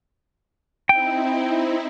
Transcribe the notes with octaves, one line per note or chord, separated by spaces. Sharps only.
C4 D#4 E4 G5